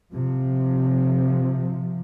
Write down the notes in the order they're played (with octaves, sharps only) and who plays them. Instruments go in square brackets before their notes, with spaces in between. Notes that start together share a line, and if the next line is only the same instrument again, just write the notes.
[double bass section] C3 F3